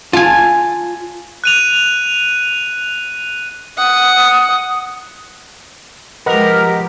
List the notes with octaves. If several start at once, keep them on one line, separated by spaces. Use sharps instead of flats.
F4 G#5 A5
F#6 D#7 F7
F#5 D#6
F3 G#3 G4 A#4 B4 D#5 F#5